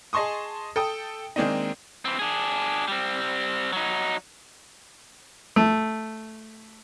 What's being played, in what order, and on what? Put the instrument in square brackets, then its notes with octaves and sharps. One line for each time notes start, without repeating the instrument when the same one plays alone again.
[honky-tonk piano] G#4 D#5 A5 C6 C#6 D#6
A4 G5 D#6
D#3 G#3 A#3 C4 D4 D#4
[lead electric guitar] E3 C4
D4 G#4
G3 C4
F#3 D#4
[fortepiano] A3